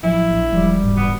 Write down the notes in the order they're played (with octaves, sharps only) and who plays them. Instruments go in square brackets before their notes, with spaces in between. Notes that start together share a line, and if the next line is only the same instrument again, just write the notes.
[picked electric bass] A1 F3 F#3 [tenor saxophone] E4
[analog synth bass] A#1
[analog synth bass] E1 [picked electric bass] F3 G#3 [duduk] G3
[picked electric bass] B1 G#2
[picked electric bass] C#2 G#2 C3 [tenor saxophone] B3